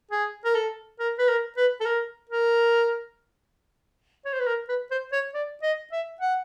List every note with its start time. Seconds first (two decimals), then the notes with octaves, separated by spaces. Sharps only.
0.11 G#4
0.45 A#4
0.55 A4
1.00 A#4
1.19 B4
1.29 A#4
1.57 B4
1.81 A4
1.86 A#4
2.30 A#4
4.26 C#5
4.33 C5
4.40 B4
4.47 A#4
4.69 B4
4.91 C5
5.13 C#5
5.34 D5
5.63 D#5
5.93 E5
6.21 F#5